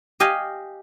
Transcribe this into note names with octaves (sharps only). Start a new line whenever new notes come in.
G4 D#5 F5 G#5